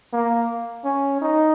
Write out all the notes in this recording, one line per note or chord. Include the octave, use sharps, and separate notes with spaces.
A#3
C#4
D#4